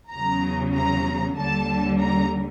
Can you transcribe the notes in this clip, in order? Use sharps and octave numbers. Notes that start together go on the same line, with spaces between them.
E2 C#3 F#3 A#5
A#5
D#2 D3 G3 A5
A#5